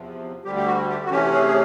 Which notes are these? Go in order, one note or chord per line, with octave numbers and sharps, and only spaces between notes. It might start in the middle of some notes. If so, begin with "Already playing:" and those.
Already playing: E2 C3 F3
D2 D3 G3 G4
G4
F#4
G4
F#4
C3 E3 A3 C#4 G4
G#4
G#4